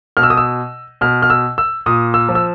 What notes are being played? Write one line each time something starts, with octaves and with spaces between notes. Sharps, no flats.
B2 F6
E6
D#6
E6
B2 F6
F6
E6
E6
A#2 D#6
E6
F3
E6